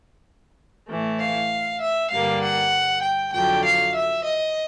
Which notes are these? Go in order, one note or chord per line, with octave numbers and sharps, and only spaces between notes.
A2 E3 A3
F5
E5
G2 D3 G3 A#3 F5
F#5
G5
F2 D3 F#3 G5
F5
E5
D#5